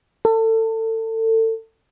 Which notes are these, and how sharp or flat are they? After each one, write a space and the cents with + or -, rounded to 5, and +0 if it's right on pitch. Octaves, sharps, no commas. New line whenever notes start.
A4 +30